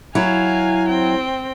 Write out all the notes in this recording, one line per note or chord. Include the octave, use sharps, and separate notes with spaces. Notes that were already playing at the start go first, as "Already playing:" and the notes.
F#3 E4 F5 G#5
C4 G5